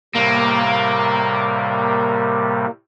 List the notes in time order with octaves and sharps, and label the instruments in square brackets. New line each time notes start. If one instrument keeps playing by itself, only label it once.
[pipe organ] A2 C3 G3 [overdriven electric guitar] A#3